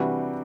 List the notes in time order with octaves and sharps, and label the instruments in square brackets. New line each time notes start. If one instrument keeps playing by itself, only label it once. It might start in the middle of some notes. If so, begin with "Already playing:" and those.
Already playing: [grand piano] C3 E3 G3 D4 F#4